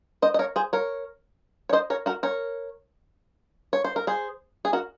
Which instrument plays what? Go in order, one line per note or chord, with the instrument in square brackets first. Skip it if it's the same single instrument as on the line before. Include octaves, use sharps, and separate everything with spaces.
[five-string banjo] C5 D#5
D#5
A#4 C#5
G#4 C5
A#4 C#5
C#5
C5 D#5
A#4 C#5
F#4 A#4
A#4 C#5
C#5
C5
A#4
G#4 C5
G#4
F#4 A#4